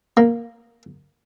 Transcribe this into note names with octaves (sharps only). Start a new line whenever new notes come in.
A#3